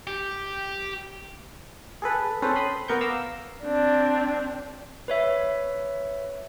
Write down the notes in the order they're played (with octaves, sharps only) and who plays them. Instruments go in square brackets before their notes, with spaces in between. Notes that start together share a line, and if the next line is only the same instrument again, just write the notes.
[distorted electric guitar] G4
[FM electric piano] G#4 A4 B4
C4 C#4 A4 B4 C5
B5 C6 D#6
B3 A#4 C#6 G6
F5 A#5 D6 E6
[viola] C4 D4
[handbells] B4 C#5 E5